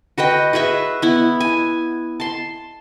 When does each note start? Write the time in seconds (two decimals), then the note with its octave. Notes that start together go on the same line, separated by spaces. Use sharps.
0.18 F#4 B4 D#5 G5
0.53 F#4 G#4 B4 E5
1.02 B3 E4
1.40 G#5
2.20 A5 C6